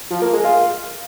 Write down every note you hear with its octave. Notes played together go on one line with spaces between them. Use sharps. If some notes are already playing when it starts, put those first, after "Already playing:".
F3
A#3
G#3
F4